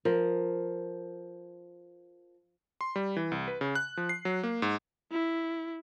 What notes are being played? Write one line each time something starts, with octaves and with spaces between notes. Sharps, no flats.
F3 A#4
C6
G3
E3
C2
B4
C#3
F#6
F3
C7
F#3
A#3
G#2
E4